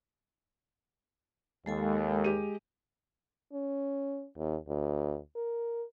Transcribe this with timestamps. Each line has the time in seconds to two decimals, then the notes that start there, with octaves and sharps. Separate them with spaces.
1.66 D#2 G#3 A4 G#5
2.24 G#3 G4 D#7
3.53 C#4
4.37 D#2
4.67 D2
5.36 A#4